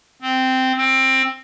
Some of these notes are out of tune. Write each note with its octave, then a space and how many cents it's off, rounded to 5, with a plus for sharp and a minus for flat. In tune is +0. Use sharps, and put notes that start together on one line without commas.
C4 -10
C4 +15